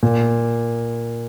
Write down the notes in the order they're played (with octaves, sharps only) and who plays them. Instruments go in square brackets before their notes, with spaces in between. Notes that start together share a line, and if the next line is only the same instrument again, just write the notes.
[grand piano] A#2